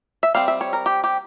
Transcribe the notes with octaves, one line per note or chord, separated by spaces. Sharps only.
E5
G3 C4 F5
E5
C#5
A#4
G4
G4